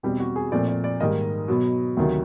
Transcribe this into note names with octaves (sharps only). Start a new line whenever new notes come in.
E2 B2 G3 C4 G4
F#4
G#4
A#2 F3 A3 C4 D5
D5
D5
G#2 D#3 G3 A#3 D#5
B2 F#3 B3
D2 C3 D#3 F#3